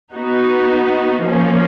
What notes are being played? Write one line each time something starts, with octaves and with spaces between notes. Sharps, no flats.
B3 D#4 F#4
F3 A#3 C#4